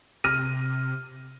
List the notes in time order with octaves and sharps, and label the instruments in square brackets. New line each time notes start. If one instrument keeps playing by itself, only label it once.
[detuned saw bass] C3 [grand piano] F6 A#6 D#7